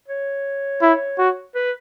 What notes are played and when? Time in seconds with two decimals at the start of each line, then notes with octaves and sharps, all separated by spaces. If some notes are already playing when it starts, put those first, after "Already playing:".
0.08 C#5
0.82 E4
1.18 F#4
1.55 B4